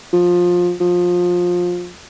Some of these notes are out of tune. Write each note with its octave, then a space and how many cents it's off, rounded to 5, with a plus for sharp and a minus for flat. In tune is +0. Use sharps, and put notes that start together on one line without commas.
F3 +20
F3 +20